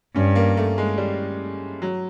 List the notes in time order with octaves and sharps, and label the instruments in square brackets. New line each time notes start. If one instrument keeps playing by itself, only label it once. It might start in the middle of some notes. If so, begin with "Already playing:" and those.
[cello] G2 [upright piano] C#4
[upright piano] A#3
A3
G#3
G3
F#3